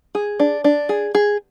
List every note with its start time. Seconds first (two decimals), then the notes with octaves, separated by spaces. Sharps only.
0.15 G#4
0.40 D4
0.64 D4
0.89 G#4
1.15 G#4